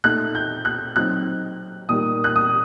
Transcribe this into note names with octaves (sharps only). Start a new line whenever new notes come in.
A#2 A3 D#4 F#6
G6
F#6
F#3 C4 D#4 F#6
A#2 G3 A#3 D#4 D#6
F#6
D#6